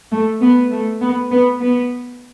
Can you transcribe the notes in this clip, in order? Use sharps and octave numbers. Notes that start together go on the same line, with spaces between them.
A3
B3
A3
B3
B3
B3